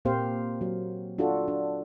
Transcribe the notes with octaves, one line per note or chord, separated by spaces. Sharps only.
A#2 A#3 C4 G4 C5 F5
F#3
D4 F4 F#4 A4
D4